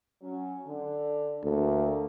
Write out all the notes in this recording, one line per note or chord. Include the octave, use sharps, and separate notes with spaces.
F#3 C#4
D3
D2 A#3 A4